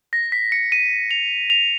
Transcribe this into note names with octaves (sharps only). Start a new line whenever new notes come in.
A#6
B6
C#7
D#7
F7
F7